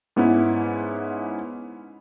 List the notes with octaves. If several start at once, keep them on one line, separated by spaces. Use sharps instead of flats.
G#2 B3 C#4 E4